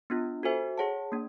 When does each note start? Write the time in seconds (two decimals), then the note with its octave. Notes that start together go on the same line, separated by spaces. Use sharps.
0.10 B3 D4 F4
0.43 F#4 A4 C5 E5 G#5
0.78 G#4 C#5 F#5 A5
1.12 A#3 D4